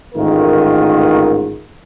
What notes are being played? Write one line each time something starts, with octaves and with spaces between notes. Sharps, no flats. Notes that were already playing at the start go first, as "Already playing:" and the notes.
A1 G#2 D#3 A3 F4 A#4